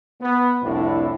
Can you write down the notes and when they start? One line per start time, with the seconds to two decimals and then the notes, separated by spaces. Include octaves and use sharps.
0.21 B3
0.63 C2 F2 A2 D4 E4